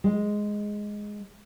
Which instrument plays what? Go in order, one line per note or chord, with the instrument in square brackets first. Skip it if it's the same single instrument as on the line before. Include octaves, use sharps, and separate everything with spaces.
[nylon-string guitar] G#3